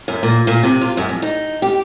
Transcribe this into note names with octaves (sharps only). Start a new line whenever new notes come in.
F#2
A#2
A#2
C3
F4
F#2
F2
D#4
G4